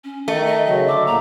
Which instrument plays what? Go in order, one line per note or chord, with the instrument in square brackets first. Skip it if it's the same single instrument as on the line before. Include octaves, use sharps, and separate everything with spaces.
[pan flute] C#4
[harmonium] D#3 [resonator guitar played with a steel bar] A3 [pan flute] D#5
[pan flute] D#5
[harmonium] C#3 F#3 [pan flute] D#5
[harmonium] D3 A4 [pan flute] D6
[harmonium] A#2 A#3 [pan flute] A#5